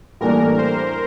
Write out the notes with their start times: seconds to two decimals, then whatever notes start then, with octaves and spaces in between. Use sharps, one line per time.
0.21 A2 E3 G3 A#3 D4 A#4
0.58 C5